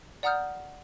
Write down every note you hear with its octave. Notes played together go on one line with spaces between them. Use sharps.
D5 F#5 A#5 D#6 F6 G6